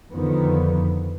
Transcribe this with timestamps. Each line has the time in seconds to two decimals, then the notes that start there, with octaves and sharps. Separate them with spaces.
0.10 F2 D3 D#3 F3 B3